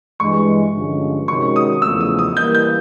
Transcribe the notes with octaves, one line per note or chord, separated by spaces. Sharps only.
G2 E3 G#3 C#6
G2 D3 F3 G#3 C#4
C3 D#3 G#3 C#4 F#4 C#6
D#6
E2 C#3 F3 A3 E6
D#6
D#6
E3 G3 A#3 G6
G6